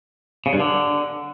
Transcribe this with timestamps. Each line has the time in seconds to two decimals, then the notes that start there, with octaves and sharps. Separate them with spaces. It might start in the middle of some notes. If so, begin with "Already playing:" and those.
0.46 C#3
0.53 G2
0.60 D3